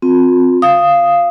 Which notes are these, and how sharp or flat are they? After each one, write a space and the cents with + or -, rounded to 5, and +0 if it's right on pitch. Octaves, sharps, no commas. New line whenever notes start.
C4 +0 F4 +35
F5 -10 D#6 +0